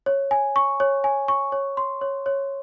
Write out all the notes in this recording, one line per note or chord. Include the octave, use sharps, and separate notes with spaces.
C#5
G#5
C#6
C#5
G#5
C#6
C#5
C6
C#5
C#5